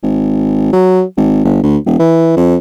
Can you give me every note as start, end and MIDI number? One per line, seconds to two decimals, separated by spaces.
0.03 0.70 32
0.73 1.02 54
1.17 1.41 32
1.45 1.60 31
1.63 1.77 38
1.86 1.97 28
1.99 2.36 52
2.37 2.56 41